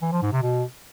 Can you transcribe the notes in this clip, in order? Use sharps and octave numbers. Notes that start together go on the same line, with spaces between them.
E3
F3
G#2
C3
B2